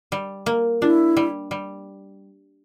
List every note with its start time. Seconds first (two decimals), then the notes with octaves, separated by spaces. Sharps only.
0.12 G3
0.46 A#3
0.81 D4 E4 F4
1.17 G3
1.51 G3